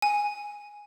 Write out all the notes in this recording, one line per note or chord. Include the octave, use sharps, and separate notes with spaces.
G#5